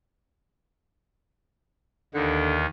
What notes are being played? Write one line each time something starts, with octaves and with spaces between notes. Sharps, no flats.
D#2 D3 D#3